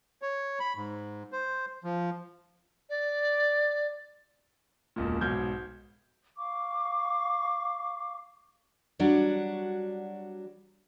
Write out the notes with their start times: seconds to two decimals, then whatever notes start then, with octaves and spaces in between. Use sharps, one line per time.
0.22 C#5
0.60 B5
0.77 G#2
1.32 C5
1.84 F3
2.90 D5
4.96 E1 C#2 A#2
5.21 B1 G#2 B2 F6 G6 G#6
6.37 F5 C#6 D6
8.99 F#3 G3 D4 F#4